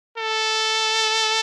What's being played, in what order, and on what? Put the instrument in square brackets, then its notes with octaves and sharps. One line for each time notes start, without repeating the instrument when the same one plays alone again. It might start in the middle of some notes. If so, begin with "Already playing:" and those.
[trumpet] A4